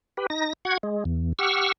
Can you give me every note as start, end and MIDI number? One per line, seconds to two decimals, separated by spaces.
0.17 0.27 67
0.17 0.27 71
0.30 0.53 63
0.30 0.53 94
0.65 0.78 66
0.65 0.78 78
0.65 0.78 92
0.83 1.04 56
1.05 1.33 40
1.39 1.72 67
1.39 1.72 78
1.39 1.72 85
1.39 1.72 88
1.39 1.72 89